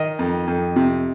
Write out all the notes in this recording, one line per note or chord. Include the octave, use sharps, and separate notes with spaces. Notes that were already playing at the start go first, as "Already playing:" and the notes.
Already playing: D#3 D#5
F2
F2
C3